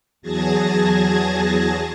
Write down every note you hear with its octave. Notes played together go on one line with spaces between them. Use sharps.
E2 F#3 G#4 A5 G#6 A#6